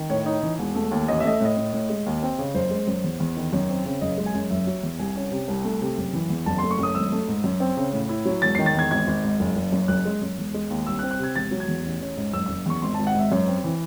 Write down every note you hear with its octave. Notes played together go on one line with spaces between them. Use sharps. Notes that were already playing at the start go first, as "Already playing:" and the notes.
Already playing: D#3
A2 C#5
D#4
E3
E1
A3
D#2
A1 D#5
E5
A3 D#5
E5
A2 D#5
A2
A2
G#3
D#2
C4
C#3
F#1 C5
G#3
F#2
E2
E2
D#3
F#2 C#5
C4
C#3
F#1 D#5
G#3
G#5
F#2
F#1 E5
F#3
E2
C2 G#5
C#4
C3
C2
A3
C3
F#1
E3
E2
F#1 A5
A3 C6
C#6
F#2 D#6
G#1 E6
A3
G#2
F#2
C4
C#3
A2
E4
F#3
E1 A6
D#3 C7
A6
E2 G#6
G#1 G#6
G#1
G#2
F#1
F#1
F#2
F#1 F#6
G#3
F#2
E1
G#3
D#2
C2 E6
F#6
C4
F#6
C3 G#6
E1 A6
F#3
G#6
E2
A1
C#4
G#2
F#1 E6
F#1 E6
E2 C#6
G#1 C6
G#1 A5
F#5
G#2 E5
F#2 C#5
C4
E3